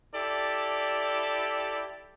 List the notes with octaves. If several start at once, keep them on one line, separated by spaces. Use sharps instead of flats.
E4 G4 A4 D5